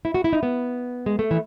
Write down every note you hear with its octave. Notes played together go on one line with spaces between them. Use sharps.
E4
F#4
E4
D#4
B3
G#3
A3
E3